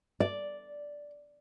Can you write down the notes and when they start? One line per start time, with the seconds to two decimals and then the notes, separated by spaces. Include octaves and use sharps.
0.20 D5